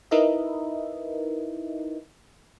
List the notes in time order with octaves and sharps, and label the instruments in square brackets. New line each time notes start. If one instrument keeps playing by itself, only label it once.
[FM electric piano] D#4 E4 A#4 B4 D#5 E5